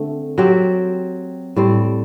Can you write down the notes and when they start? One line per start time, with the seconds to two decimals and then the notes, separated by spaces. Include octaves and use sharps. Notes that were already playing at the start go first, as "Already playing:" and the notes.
Already playing: D3 A3 C4
0.38 F#3 C4 G4
1.56 A2 G3 C4